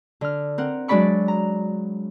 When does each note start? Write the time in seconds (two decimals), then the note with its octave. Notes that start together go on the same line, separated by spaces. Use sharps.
0.21 D3 F6
0.58 C4 A#4 F#5
0.88 F#3 G#3 D4 D5 B5 C#6
1.28 A#5